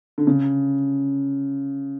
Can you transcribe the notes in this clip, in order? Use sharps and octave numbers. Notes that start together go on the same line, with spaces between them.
D3
C#3